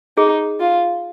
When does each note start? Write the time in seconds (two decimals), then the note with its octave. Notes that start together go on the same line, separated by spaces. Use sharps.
0.17 D#4 G#4
0.61 F4